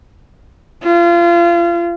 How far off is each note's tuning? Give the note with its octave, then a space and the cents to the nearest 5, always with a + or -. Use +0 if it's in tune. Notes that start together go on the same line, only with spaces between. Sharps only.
F4 -30